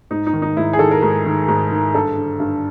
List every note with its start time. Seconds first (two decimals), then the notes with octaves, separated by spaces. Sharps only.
0.11 G#2 D#4
0.27 D#4
0.33 D#3
0.42 D#4
0.57 G#2 E4
0.73 G#4
0.79 D#3 A4
0.91 A#4
1.02 G#2
1.26 D#3
1.48 G#2
1.72 D#3
1.94 G2 A4
2.17 D3
2.40 G2